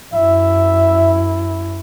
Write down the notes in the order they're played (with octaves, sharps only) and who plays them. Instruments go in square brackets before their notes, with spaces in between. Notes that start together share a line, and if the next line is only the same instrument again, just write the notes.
[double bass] F#2 E4 [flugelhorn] E5